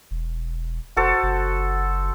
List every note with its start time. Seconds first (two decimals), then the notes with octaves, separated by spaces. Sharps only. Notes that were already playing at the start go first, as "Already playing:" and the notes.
0.11 E1
0.97 F1 F#4 A4 C5
1.23 F#1